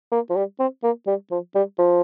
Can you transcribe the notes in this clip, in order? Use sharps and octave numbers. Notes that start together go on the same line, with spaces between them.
A#3
F3
G3
C4
A#3
G3
F3
G3
F3